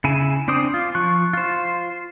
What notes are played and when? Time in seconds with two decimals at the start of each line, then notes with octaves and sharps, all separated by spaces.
0.04 C#3 E4 G#5
0.48 C4 D4 C5 D5 D#6
0.74 F4
0.95 F3 C#6 F#6
1.33 F4 C5